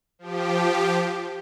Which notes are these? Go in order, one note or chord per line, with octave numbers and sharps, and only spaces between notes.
F3 G4